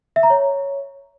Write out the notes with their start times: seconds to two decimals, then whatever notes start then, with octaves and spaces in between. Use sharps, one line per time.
0.16 E5
0.23 A#5
0.30 C#5